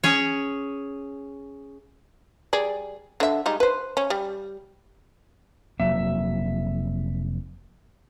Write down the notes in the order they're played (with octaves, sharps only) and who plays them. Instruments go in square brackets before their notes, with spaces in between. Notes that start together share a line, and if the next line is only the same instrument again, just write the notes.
[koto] C#4 G#4 C#5
[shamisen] G3 G#4 D5
D3 E5
G3 G#3 D#4
B4 C5
C#4
G3
[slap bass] F1 F#3 A#3 [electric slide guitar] E5